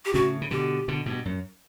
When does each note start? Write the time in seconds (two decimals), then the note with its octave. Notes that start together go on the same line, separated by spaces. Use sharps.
0.05 G4
0.14 A2 C#3 F#4
0.41 C#3
0.51 B2 D3 G4
0.88 B2 D3
1.06 G2 B2
1.25 F#2